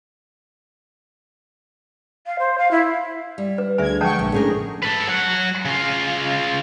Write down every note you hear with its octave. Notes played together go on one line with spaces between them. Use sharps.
F5
C5
F5
E4
G3
B4
D2 G#4 E5 G#5 G#6
F3 G#3 F#5 G5 A5 C#6
A#1 F#2
A2 D3 C#4 G#4 A#4
A4 B4
F#3 F#5
C#3 F4